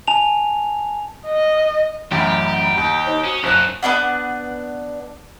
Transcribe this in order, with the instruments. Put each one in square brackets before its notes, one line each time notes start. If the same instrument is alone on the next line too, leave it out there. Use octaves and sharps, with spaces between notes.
[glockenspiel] G#5 A5 F7
[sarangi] D#5
[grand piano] A1 F#2 [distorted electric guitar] G4 [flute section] F#5 A#5 B5
[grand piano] D#2
[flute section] D#4 C5 C#5
[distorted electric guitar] C#4 [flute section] F#4 D#6
[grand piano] F#1 F#6 [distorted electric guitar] E3 D#4 [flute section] C5
[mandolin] B3 C#4 D4 F#5